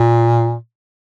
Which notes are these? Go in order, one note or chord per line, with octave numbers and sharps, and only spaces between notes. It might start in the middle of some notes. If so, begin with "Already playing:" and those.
Already playing: A#2